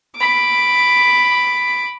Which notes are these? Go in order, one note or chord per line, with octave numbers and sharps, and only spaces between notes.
B5 D6